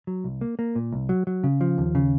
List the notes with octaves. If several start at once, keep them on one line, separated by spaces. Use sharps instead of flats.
F#3
C2
A#3
A#3
A#2
C2
F#3
F#3
C#3
F3
D#2
C#3